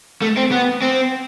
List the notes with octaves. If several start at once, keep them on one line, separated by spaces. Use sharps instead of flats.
A3
C4
B3
C4